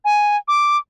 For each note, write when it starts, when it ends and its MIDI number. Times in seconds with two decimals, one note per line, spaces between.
0.05 0.37 80
0.48 0.77 86